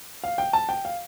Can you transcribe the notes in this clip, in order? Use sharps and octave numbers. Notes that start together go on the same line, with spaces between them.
F5
G5
A5
G5
F5